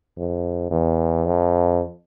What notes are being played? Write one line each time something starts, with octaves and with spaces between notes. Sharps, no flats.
F2
E2
F2